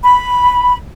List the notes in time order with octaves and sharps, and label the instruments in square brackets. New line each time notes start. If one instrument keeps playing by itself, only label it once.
[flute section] B5